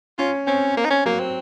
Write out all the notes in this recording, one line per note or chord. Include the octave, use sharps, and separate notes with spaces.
C#4 F4
C4 C#4
A#3
D#4
C#4
F#3 A#3
C4